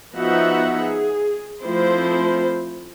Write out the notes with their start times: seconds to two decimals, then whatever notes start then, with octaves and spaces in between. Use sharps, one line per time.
0.16 F3 B3 D#4 F#4 E5 F#5
0.81 G#4
1.62 F3 A3 C4 E4 C5